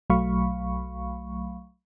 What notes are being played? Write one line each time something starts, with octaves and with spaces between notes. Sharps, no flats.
B1 F#3 A3 F5 B5 C#6